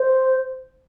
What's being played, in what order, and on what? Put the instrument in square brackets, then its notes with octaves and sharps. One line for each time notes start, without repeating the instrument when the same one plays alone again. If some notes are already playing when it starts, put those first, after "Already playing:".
Already playing: [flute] C5